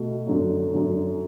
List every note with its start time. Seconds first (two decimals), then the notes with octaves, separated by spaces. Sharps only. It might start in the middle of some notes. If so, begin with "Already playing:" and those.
Already playing: B2 A3
0.27 F#2 D3 F#3
0.73 F#2 D3 F#3